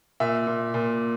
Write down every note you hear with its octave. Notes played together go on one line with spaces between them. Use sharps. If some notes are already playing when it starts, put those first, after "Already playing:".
A#2 E5
A#2
A#2